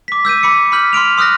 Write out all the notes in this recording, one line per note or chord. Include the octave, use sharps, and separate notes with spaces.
D6 B6
E6 G6 B6 D#7
B5 D6 C#7
B5 E6 F6 G6 B6 F#7
C6 F6 D7 F7
C6 D#6 F6 F#6 A#6